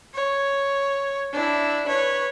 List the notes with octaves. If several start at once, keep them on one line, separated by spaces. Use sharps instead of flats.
C#5
D4 E4
B4 C#5